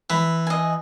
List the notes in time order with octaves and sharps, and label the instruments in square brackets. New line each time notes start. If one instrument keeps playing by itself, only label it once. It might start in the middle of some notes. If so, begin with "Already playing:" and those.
[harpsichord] E3 [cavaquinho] B5
[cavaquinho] D#5 G#5